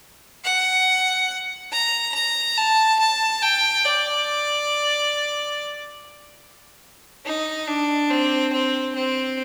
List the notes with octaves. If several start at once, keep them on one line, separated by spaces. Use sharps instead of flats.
F#5
A#5
A#5
A5
A5
G5
D5
D#4
D4
C4
C4
C4